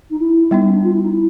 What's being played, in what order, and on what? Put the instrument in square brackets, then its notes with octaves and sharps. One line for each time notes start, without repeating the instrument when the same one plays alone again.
[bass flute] D#4
E4
[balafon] G3 B3 D#4
[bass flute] C#4
D4
F4
E4
D#4
E4